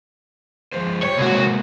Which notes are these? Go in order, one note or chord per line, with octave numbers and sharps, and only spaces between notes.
F3 G#3 C5
G3 C#5
C2 G#3 A#3 F#4